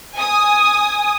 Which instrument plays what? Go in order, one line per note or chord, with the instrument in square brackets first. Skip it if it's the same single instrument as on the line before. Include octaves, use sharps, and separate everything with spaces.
[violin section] G#5 D#6